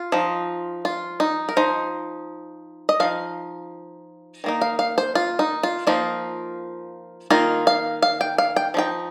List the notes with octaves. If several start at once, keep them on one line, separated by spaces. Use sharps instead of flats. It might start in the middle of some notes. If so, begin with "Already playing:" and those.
Already playing: F4
F3 D#4
F4
D#4
A#4
F3 D#4 C5
D#5
F3 D#4 F5
D#3 A#3 D#4
F5
F5
C5
F4
D#4
F4
F3 A#3 D#4 F4
D#3 A#3 D#4 F4
F5
F5
G5
F5
G5
F3 D#4 G5